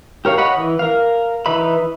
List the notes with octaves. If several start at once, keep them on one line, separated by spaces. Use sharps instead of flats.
G4 A#4 C#5 F5
C#5 D#5 F#5 B5
E3
A#4 F5
E3 D#4 B4 E5 B5